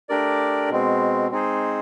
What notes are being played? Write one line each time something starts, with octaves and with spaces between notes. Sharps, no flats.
A3 D4 G4 A#4 D5
B2 G#3 C4
G#3 C4 D#4 G#4 C5